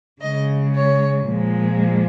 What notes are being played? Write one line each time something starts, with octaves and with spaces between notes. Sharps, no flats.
C#3 G#3 D#5
C#5
A#2 F3 G#3